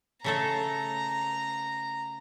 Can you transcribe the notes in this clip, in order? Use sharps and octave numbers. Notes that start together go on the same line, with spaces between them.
C#3 A3 A4 A#5